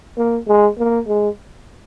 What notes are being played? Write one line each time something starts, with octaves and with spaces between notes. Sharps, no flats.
A#3
G#3
A#3
G#3